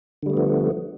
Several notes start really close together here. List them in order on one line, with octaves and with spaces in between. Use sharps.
D3 G3 A3 B3 F3